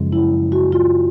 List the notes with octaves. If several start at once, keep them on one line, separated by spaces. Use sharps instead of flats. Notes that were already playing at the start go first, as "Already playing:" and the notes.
Already playing: F#2 C#3 F3 G#3
E4
F#4
F4